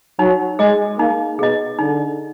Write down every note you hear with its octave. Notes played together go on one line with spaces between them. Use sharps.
F#3 D#4
G#3 G#4 D#5
A#3 D#4
B2 G#4 D#5
D3 D#4